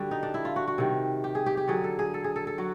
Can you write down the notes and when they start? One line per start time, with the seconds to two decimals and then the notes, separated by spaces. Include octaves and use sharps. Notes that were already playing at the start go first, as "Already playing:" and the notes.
Already playing: D3 G3 F#4
0.11 D#4
0.23 D4
0.34 E4
0.45 F4
0.56 F#4
0.68 F#4
0.78 C3 D#3 G3
1.24 G4
1.35 G#4
1.46 G4
1.57 G4
1.68 D3 F#3 G#4
1.84 A4
1.99 G#4
2.14 A4
2.24 G#4
2.36 A4
2.47 A4
2.58 F#3 F#4